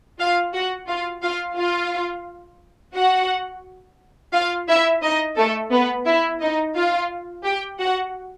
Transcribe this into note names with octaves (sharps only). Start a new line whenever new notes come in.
F4 F5
F#4 F#5
F4 F5
F4 F5
F4 F5
F#4 F#5
F4 F5
E4 E5
D#4 D#5
A3 A4
B3 B4
E4 E5
D#4 D#5
F4 F5
G4 G5
F#4 F#5